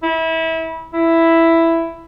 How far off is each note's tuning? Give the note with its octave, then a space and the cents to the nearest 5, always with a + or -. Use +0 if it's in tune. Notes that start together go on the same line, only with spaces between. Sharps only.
E4 -25
E4 +5